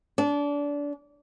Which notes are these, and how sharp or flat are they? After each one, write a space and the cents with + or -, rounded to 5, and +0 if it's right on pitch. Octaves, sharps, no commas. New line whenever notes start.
D4 -25